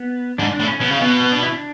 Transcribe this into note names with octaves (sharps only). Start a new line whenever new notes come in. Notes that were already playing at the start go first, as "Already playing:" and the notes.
Already playing: B3
G#2 D4
D4
A2
C#4
B2 C#4
C#3
B2 B3
B3
D4
E4
D4